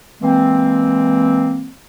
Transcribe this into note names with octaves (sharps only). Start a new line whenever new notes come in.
E3 G#3 A#3 C4